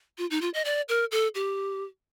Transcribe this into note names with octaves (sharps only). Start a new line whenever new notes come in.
F4
D#4
F4
D#5
D5
A#4
A4
G4